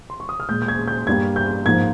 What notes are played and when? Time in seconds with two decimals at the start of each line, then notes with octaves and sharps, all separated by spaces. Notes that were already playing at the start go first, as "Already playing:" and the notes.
0.10 C6
0.20 C#6
0.29 D#6
0.40 F6
0.49 A#2 G#3 G6
0.62 G6
0.68 G#6
0.88 G6
1.07 G2 G3 A#3 G#6
1.36 G6
1.66 G#2 F3 A#3 G#6